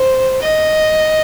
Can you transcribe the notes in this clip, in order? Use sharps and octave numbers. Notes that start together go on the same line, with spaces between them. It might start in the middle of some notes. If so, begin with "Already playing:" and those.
Already playing: C5
D#5